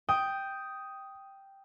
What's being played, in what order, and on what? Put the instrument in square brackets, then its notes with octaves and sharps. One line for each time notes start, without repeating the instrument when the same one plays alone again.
[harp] G5 [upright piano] D#6